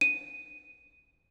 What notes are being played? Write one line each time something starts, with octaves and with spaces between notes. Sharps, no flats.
D#7